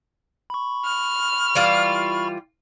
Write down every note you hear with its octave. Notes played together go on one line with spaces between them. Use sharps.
B5 C#6
F6
E3 G3 F4